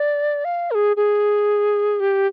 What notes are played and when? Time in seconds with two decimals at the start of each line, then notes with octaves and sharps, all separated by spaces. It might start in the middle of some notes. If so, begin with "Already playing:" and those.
Already playing: D5
0.45 F5
0.71 A#4
0.75 G#4
0.96 G#4
2.00 G4